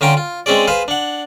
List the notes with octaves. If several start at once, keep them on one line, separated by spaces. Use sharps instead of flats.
D3 C#4 F4 G5 A#5 C6
F4
G#3 C4 C#4 G#4 D5
G#4 B4 C5 F5
D4 F#5